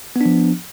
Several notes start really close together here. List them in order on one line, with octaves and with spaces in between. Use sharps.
B3 D4 F3